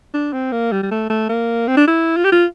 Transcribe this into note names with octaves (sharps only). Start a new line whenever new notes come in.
D4
C4
A#3
G3
G3
A3
A3
A#3
C4
D4
E4
F4
G4
F4